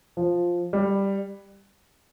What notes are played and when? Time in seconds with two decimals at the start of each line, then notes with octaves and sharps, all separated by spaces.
0.17 F3
0.73 G3